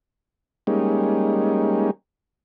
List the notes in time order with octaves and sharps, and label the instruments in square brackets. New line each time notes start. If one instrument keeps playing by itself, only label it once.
[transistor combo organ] G3 G#3 A#3 C#4 D#4